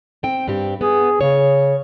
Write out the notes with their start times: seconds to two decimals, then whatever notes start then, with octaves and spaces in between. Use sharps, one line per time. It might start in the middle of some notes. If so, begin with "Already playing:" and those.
0.23 C4 G5
0.47 G2 C4 G4
0.81 B3 G#4
1.21 C#3 C#5